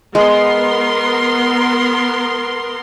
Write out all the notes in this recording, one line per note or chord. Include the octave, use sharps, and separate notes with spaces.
G#3 B3 A#4 C6